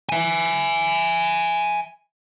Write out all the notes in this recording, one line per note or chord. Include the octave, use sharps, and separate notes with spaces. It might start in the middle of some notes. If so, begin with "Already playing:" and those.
E5 G#5